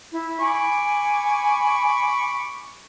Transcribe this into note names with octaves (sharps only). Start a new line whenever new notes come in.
E4
G#5 B5 C#6 D6